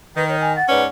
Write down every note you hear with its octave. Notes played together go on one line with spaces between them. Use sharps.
D#3 B4
C#5
G#5
F#5 A6
G#2 C#4 B4 D5